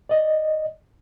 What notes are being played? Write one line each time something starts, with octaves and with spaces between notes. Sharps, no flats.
D5 D#5